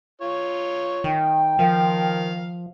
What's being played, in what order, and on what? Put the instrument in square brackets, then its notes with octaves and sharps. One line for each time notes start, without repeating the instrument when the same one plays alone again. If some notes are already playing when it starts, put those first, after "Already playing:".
[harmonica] F4 C#5
[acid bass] D#3 [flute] G5
[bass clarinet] D#3 [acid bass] F3 [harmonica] F5